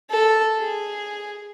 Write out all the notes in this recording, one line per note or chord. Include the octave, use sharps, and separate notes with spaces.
A4
G#4